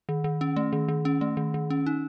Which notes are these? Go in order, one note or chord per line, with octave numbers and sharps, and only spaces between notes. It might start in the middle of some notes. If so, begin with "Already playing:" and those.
D#3
D#3
C#4
A3
D#3
D#3
C#4
A3
D#3
D#3
C#4
D#4